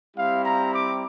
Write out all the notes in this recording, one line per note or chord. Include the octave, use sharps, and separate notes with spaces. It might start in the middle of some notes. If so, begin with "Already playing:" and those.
G3 C4 E4 G4 F5
A#5
D6